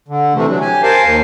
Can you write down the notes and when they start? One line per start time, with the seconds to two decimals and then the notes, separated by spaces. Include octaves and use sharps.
0.08 D3
0.34 C3 E3 A3
0.48 F#3 D4
0.61 G4 G#5
0.83 A#4 C5 F5 G#5 A5
1.03 D#2 F5